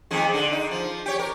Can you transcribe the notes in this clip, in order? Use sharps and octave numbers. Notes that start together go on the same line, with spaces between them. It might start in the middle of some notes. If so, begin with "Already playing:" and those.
F2 D#3 G#3
D3
D#4
F3
G4 C#5
A#4